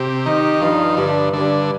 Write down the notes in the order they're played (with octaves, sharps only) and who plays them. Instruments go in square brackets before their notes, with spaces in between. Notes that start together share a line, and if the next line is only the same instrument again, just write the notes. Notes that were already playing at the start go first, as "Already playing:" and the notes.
Already playing: [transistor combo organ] C3 [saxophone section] G4
[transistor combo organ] D#3 [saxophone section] D#4
[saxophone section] G2 [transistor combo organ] F3
[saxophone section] G2 [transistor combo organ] D3
[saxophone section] G2 [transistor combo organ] D3